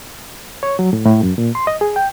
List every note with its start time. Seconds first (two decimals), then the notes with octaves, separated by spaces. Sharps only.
0.63 C#5
0.79 F#3
0.93 A2
1.05 A2
1.23 F#2
1.38 A#2
1.55 C6
1.67 D#5
1.81 G#4
1.96 G5